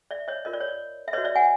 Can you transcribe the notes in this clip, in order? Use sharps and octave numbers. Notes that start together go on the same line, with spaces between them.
D5 E5
C#5 D#5
F4 A#4 C#5 D#5
D5
C#5
D5
E5
F#4 B4 C#5 D#5
D5 E5
F#5 G#5